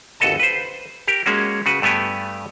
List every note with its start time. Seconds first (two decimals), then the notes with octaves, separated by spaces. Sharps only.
0.20 G1 D#2 F#4 A4 D#5 A5
0.40 B4 C5
1.08 G4 A#4
1.26 G#3 A#3 C#4 F#4
1.66 C#3 F#4 B4
1.82 G2 A3 B3 G4 G#5